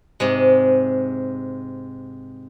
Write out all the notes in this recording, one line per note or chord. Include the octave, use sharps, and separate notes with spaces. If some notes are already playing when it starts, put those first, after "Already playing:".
G#2 C3 G#3